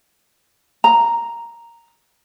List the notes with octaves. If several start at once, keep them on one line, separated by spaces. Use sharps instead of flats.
A#5